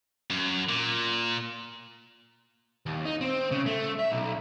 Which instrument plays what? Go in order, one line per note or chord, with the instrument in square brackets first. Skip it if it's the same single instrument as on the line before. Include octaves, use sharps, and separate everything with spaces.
[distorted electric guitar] F#2
A#2
[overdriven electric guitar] D#2
D#4
C4
C#3
A3
E5
B1